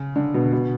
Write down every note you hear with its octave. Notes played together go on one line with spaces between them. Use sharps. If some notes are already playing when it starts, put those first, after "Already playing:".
Already playing: C#3
D3
B2
B2